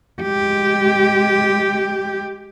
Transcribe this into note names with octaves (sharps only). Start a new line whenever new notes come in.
G#3 G4